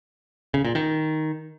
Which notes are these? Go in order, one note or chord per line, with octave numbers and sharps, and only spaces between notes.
C#3
A#2
D#3